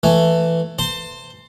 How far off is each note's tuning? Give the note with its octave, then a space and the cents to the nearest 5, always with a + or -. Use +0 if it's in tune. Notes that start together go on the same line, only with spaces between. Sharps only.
E3 +10 A3 +10
C5 +0 A5 +40